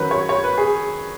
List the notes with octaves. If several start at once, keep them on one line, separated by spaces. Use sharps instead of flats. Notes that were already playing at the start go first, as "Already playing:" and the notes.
Already playing: F#2 D#3 F#3 B4
C#5
C#5
B4
G#4